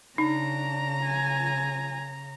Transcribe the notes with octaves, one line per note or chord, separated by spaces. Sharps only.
C#3 D4 D#4 A#5
G#5